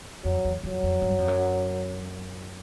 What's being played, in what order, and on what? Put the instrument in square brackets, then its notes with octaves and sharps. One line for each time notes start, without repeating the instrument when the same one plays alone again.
[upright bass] F2 [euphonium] F#3
[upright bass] E2
[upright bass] F2 [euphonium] F#3
[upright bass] F2
G2
F#2
F2
F#2